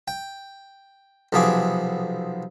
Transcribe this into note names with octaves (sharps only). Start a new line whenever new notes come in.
G5
B1 C3 F3 B3 G#4 D6